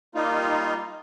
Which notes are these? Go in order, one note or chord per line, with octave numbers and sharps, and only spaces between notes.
G3 A#3 D#4 F4